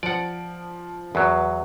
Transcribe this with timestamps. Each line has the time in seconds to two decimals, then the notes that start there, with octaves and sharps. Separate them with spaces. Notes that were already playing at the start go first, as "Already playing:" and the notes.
0.03 F3 D5 F#5 A5 D7
1.15 E2 F#3 B4